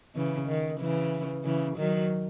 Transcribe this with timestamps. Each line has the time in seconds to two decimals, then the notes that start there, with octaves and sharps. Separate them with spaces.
0.15 C#3 E3
0.47 D#3
0.79 C#3 E3
1.44 C#3 E3
1.77 D#3 F#3